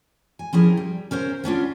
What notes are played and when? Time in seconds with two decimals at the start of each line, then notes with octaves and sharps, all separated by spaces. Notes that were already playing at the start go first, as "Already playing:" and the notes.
0.39 G#5
0.53 F3 C#4 E4 G4 G#4 A#4
0.77 G3
1.11 C#4 A#4 C5 F5
1.44 B3 C#4 D4 F4